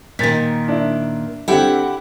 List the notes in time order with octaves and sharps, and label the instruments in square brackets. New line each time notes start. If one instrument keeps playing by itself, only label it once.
[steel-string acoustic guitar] A#2 D#3 [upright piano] A6 B6
[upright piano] D4 E4
[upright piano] D3 C4 A4 [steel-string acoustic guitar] E4 G4 F#5